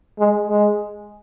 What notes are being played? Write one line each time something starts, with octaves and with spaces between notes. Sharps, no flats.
G#3
G#3